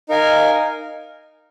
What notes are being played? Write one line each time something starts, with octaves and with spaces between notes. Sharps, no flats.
D#4 A#4 F5 G#5